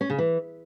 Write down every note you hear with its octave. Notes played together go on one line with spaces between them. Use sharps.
C#4
C#3
E3